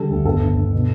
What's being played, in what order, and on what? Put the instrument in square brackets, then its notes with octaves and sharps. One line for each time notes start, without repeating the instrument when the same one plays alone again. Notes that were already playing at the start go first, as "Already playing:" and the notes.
Already playing: [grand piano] D3 G3 A4
D2
G1 A4
G1
G1
B2